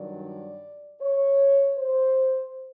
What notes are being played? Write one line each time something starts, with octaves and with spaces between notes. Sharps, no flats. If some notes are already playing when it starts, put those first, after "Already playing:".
Already playing: G2 D#3 F#3 D5
C#5
C5